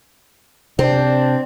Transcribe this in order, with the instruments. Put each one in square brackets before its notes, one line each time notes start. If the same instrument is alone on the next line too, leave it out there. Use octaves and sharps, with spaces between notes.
[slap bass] C3 [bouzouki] C4 [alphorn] D4